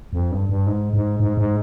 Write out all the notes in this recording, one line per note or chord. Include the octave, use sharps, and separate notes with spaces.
F2
G2
G2
G#2
G#2
G#2
G#2